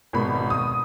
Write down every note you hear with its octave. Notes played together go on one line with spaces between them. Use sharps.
G#1 B2 B5
D#6